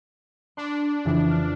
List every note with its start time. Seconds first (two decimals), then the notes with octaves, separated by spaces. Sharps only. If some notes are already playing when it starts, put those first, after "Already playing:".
0.57 D4 C6
1.05 F2 C#3 E3
1.30 F6